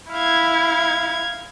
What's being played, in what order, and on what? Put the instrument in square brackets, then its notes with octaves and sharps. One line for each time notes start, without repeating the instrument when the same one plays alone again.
[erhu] E4 [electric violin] F5 G#6